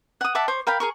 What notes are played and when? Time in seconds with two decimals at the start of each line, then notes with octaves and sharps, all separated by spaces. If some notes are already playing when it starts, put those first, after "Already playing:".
0.21 F#5 D#6
0.35 E5 F#5 A5 D6
0.48 C5 C#5
0.67 A#4 F5 G5 B5
0.80 G#4 A#4 C#6